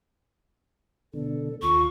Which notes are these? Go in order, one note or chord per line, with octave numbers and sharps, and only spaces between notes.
B2 D3 A4
D#2 F4 C#6